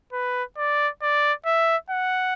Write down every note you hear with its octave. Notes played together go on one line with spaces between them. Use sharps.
B4
D5
D5
E5
F#5